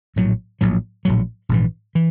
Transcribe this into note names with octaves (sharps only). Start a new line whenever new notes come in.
A#1 A2 F#3
A#1 A2 F#3
A#1 A2 F#3
A#1 G#2 E3
E3